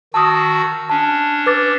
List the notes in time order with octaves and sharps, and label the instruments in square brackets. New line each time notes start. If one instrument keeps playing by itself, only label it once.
[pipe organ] D#3 F#4 E6 [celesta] A5 D#6
[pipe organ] C#4 D4 [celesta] A5
[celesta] B4 D6 A6